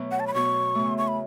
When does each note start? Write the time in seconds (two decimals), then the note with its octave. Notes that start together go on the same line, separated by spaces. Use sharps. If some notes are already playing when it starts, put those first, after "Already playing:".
Already playing: B2 F#3 A3 B3 F#4
0.11 F#5
0.20 A5
0.27 B5
0.34 B2 B3 F#4 C#6
0.75 E2 C#3 A3
0.98 C#6
1.08 B5